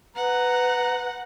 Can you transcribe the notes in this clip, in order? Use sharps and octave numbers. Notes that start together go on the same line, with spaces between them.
B4 F#5 A#5